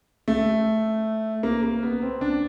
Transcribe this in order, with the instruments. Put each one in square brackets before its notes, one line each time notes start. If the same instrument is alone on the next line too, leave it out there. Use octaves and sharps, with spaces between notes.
[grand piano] A3
A#3
A#3
B3
C4
D4